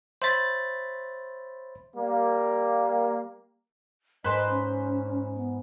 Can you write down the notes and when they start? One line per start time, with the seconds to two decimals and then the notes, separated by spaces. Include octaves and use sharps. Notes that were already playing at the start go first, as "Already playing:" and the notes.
0.22 C5 C#5 E5 B5 A6 B6
1.95 G3 A#3
4.24 G#2 B4 C5 D#5 B5
4.49 C#4
5.35 B3